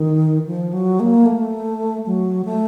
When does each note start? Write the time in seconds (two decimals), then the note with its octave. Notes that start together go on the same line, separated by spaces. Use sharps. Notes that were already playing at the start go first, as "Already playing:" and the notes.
Already playing: D#3
0.47 F3
0.73 F#3
1.00 A#3
1.26 A3
2.06 F#3
2.45 A3